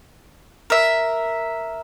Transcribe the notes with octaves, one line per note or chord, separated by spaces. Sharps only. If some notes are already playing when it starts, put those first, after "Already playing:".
A#4 E5